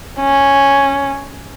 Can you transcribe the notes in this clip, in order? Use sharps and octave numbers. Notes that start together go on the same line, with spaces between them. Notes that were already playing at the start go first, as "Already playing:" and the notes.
C#4